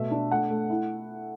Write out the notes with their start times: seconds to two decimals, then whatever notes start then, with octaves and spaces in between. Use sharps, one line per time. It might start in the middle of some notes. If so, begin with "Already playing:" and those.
Already playing: B2 A3 E5
0.11 D4
0.31 A3 F#5
0.50 A3
0.70 E4